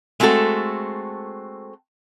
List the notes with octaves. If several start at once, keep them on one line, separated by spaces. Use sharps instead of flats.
G#3 A3 C4 F#4 A4